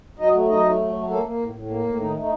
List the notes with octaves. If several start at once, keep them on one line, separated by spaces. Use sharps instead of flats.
F#3 D#4 D#5
A3
F#3 D#4 D#5
A3
F#3
F#3
A3 A#3 A4
A#3
A2
A2
A#3
A2
D#3 D#4
A3 D#4